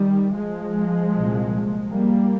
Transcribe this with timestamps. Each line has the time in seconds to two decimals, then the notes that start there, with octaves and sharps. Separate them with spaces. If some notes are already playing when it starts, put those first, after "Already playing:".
Already playing: D#3 G3
0.35 F3 G#3
1.13 C2 A#2
1.89 G3 A#3